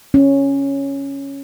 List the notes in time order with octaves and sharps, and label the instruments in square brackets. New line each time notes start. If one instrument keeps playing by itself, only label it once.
[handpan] C#4